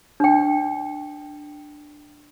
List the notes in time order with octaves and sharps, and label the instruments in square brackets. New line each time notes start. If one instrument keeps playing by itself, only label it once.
[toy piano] D4 G5